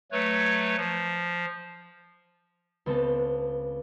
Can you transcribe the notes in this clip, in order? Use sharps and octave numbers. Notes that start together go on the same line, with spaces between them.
F#3 A3 B4 C#5
F3
C#2 B3 C4 A4 A5